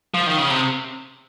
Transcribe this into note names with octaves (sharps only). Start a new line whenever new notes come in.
F3
D#3
C#3
C3